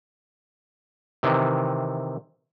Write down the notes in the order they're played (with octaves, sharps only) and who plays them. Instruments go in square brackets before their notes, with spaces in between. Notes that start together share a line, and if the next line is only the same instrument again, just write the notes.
[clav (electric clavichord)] C3 D#3 E3